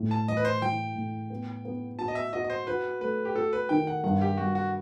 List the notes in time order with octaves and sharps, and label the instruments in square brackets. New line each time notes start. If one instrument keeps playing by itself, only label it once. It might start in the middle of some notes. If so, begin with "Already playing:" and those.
Already playing: [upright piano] A2
[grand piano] A5
[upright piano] E3 [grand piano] D#5
[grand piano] B4
C5
[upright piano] E3 [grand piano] G5
[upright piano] A2
B3
B3
[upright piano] F#4 [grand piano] A5
[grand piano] D#5
E5
[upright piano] F#4 [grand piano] D#5
[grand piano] D#5
C5
[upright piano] F#4 [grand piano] B4
[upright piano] A3 [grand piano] B4
[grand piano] G4
[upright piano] F#4 [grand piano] A4
[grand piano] B4
[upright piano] D#3 [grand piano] G5
[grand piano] F#5
[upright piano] G2 [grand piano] F#5
[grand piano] G4
[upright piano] G3 [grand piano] F#4
[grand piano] F#4